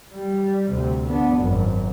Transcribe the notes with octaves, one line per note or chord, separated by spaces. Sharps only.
G3
D2 C3
B3 D4
G#1 F#2